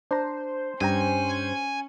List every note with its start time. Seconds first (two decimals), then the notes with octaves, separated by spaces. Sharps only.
0.11 D4 C5 A#5
0.81 G2 C#4 G5 G#5 A#5